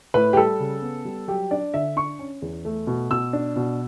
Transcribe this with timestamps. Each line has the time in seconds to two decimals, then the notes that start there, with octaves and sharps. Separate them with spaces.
0.14 A2 B4
0.33 G4
0.36 G3 A4
0.60 C#3
0.82 B3
1.05 G3
1.28 F#3 G4
1.51 D4 D5
1.74 D3 E5
1.96 D4 C#6
2.19 C#4
2.42 E2
2.65 A3
2.87 B2
3.10 B2 E6
3.33 D4
3.56 B2